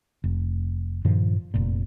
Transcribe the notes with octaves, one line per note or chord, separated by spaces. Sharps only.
F1
G2 A#2 D#3 F3
F1 A#2